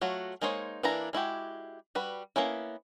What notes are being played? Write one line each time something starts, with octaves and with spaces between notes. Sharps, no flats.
F#3 A3 F4 F#4
G#3 A#3 D#4 C5 C#5
E3 A#3 D4 E4 A#5
G#3 E4 F#4 G4
G3 F#4 B4
A#3 B3 C#4 E4